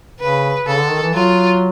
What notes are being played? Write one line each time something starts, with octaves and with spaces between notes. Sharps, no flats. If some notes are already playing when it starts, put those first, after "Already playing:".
C#3 B4
C#3 A4
D3
D#3
E3
F#3 F4